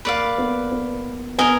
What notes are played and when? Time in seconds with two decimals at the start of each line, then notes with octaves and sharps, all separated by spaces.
0.05 A#3 B4 D5 F5
0.38 B3
0.72 B3
1.38 B3 A#4 D#5 G#5